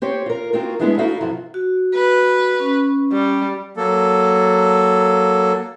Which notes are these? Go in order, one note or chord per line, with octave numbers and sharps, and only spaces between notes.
C4 G4 C5 C#5
F4 A#4
C4 D#4 F4 F#4 A#4
G#3 A3 B3 D4 E4 G#4
D#4 E4 F#4 A4 F5
G2 C3 F3 F#3
F#4
B4
C#4
G3
F#3 A#3 A4